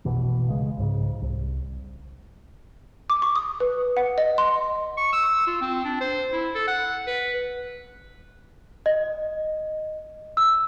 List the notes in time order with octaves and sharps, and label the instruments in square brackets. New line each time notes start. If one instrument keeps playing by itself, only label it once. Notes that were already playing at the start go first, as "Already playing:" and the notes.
[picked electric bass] F1 A#1 B2 E3
C#3 G#3
C2 G#2 C#3
C2
[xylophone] D6
C#6
D#6
B4
F#5
D#5
C6
[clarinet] C#6
E6
F4
C4
D4
C5
E4
A4
F#5
B4
[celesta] D#5
E6